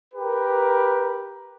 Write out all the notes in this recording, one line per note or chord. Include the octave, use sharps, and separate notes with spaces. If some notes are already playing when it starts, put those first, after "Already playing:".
G4 A#4 B4